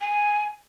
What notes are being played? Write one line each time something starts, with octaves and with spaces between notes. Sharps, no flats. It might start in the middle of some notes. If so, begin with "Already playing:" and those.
G#5